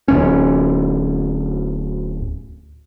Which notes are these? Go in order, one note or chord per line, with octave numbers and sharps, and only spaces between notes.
D1 C#4